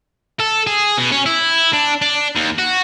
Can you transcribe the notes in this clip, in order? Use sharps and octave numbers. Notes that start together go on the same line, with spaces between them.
A4
G#4
B2
C#4
E4
D4
D4
D#2
F#4